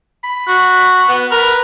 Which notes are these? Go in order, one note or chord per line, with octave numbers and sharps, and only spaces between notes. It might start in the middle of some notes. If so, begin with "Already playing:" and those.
B5
F#4
B3
A#4 B4